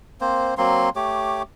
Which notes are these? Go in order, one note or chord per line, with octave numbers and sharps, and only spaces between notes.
A#3 C4 C5
F#3 A#3 C4 C6
A3 G4 C#5 D6